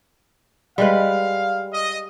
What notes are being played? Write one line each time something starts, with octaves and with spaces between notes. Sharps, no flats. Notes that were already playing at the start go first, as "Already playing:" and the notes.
G3 G#3 B4 F5
D#5